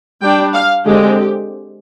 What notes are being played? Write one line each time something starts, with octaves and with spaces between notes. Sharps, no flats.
G3 D4 G5
F5
D3 G#3 C4 G4